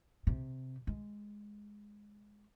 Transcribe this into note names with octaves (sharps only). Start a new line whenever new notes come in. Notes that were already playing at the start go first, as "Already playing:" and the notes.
C3
G#3